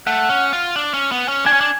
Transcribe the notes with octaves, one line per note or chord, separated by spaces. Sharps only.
A3 F#5
C#4
F4
D4
C#4
B3
C#4
D4 G#5
C#4
D4